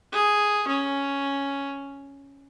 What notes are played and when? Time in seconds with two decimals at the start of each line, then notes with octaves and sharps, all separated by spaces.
0.12 G#4
0.68 C#4